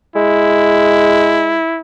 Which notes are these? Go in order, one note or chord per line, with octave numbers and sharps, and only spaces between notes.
G#3 E4